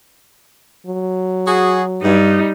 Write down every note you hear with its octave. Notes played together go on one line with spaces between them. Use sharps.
F#3
F#4 G#4
G2 G3 D#4